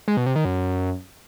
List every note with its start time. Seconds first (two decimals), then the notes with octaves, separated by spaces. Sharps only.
0.08 G#3
0.17 B2
0.26 C3
0.36 D#3
0.45 F#2